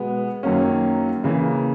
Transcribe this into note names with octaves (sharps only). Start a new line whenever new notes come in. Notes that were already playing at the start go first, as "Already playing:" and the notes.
Already playing: B2 G#3 B3
F#2 D#3 F#3 A#3 C#4
C#3 E3 A#3